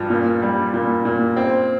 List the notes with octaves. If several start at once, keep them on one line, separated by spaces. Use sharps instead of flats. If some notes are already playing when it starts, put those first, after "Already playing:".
Already playing: G2 F3
A#2
G3
A#2
A#2
C4